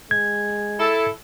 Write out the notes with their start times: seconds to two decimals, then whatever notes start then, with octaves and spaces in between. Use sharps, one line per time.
0.11 G#3 G#6
0.79 E4 A4